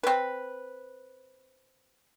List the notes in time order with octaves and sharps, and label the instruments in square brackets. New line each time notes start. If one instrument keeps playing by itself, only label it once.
[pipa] C4 B4